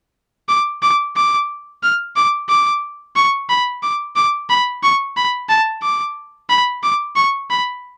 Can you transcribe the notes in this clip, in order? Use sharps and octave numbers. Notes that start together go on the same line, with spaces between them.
D6
D6
D6
F6
D6
D6
C#6
B5
D6
D6
B5
C#6
B5
A5
D6
B5
D6
C#6
B5